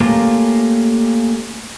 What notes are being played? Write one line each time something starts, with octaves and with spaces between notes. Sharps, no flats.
A3 A#3 C#4 F4 G4 A#4